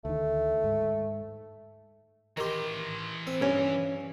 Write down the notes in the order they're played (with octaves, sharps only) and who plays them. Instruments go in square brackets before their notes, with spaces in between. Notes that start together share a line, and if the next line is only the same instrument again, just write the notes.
[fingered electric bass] D2 D#3 [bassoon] A3
[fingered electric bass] G#2
[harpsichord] D#3 G4 [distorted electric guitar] E3 C6
[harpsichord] C4
[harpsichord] G2 [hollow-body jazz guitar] C#4